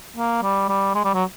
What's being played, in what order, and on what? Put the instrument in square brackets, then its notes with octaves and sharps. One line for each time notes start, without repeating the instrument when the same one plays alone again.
[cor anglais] A#3
G3
G3
G#3
G3
F#3